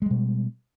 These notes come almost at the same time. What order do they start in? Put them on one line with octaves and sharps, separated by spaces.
G#3 G3 B2